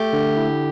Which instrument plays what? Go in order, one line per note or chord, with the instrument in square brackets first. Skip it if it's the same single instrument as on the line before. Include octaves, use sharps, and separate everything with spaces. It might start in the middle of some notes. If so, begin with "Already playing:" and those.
Already playing: [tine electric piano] A3 [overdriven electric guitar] G4
[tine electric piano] D3
E4